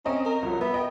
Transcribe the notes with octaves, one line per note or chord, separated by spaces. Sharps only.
C4 C#4 D#5 A#5
A#4
C2 F3 F#3
B3 E5
D#5 G5